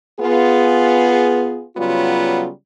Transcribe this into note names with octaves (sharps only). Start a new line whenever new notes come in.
B3 F4 G#4
C#3 F#3 G3 B3 F4